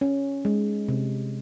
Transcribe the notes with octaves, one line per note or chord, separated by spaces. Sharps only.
C#4
G#3
C3